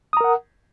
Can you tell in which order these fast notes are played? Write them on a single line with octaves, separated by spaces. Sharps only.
D#6 A#5 A#4 F#5